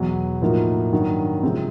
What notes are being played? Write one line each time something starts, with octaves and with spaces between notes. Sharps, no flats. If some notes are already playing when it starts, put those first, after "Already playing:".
Already playing: E2 B2 F#3
A2 F3 A#3 D#4 F#4
G2 D#3 F#3
C3 F3 G#3 C4